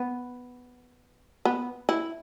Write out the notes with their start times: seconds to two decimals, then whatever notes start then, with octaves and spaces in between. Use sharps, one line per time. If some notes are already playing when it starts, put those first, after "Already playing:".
Already playing: B3
1.45 B3
1.89 E4